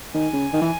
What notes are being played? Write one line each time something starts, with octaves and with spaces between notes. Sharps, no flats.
D#3 G#5
C#3
D#3
E3